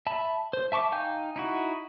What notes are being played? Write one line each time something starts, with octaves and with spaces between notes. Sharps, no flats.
E5 A5 B5
C5
E5 A5 C#6 D6
D#4 F5 G5 G#5 G6
D#4 E4 F#4